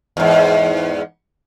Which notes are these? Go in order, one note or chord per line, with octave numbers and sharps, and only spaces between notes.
E2 G#2